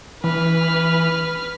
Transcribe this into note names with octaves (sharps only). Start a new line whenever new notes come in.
E3 B4 F6